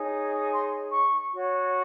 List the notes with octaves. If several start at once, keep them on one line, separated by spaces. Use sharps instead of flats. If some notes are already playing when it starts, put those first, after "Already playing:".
Already playing: D#4 G#4 C#5
C6
C#6
F#4 C#5